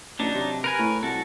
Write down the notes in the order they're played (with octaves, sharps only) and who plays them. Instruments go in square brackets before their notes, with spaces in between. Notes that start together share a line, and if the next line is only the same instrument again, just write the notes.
[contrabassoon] A1 [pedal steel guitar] F#3 D4 D#4
[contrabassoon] C3
[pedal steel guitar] A#4 B4 G#5
[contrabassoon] A2
[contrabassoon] C2 [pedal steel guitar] F#4 A4